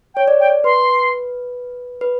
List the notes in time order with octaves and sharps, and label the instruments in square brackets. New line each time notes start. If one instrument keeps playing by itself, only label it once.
[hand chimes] C#5 [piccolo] G5
[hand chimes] D5
[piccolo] G5
[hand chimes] B4 [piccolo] C6
[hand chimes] B4